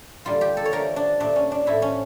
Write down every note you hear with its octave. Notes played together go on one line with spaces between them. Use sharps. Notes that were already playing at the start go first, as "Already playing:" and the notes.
D3 G3 A#3 F4
G4
A4
C#5
D3 F3 A3 A#4
D4
A#2 A3 D4
C#4
D4
A2 F3 A3 E4
C#4